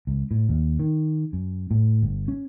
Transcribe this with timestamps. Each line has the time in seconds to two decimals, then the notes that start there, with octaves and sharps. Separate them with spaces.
0.07 C#2
0.31 A2
0.49 D#2
0.79 D#3
1.33 F#2
1.71 A2
2.02 G1
2.28 C#4